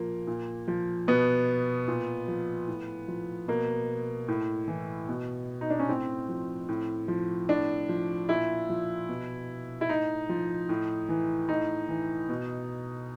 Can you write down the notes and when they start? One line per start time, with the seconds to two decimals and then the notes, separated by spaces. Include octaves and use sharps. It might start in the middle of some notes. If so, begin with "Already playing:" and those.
Already playing: A#2 F3 A#3
0.27 A#2
0.68 F3
1.08 B2 B3
1.88 A#2
2.28 F3
2.67 A2
3.08 F3
3.48 B2 A#3
4.28 A2
4.68 E3
5.09 B2
5.61 D#4
5.70 D4
5.80 C#4
5.89 A2 C4
6.29 F3
6.68 A2
7.08 F3
7.48 A2 D4
7.89 F3
8.29 A#2 E4
8.69 F3
9.09 B2
9.81 E4
9.89 A2 D#4
10.29 F3
10.69 A2
11.09 E3
11.49 A2 D#4
11.89 E3
12.29 B2